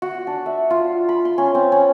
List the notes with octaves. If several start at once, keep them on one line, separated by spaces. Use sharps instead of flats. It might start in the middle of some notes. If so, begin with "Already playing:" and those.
F#4
D4
E5
F4
B5
C6
C#4
C4
C#4